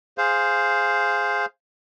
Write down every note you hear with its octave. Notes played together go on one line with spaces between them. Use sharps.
G#4 C5 F5